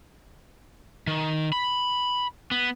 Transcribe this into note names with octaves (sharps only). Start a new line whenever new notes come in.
D#3
B5
B3